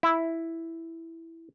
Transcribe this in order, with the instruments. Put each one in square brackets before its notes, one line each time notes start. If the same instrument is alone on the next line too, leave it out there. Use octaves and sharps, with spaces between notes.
[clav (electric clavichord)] E4